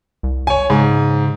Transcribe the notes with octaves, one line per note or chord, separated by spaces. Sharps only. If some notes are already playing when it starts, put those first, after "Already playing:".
C2
C#5 G#5
G#2 C#3